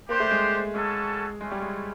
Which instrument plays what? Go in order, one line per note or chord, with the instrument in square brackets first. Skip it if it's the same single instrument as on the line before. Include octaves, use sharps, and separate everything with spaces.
[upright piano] A#3 [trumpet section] D4 G4 C5
[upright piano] A3
G#3
[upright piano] G#3 [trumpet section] A#3 C#4 F#4 A4
[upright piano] G#3 [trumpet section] A3 C#4 E4
[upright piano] G3
G#3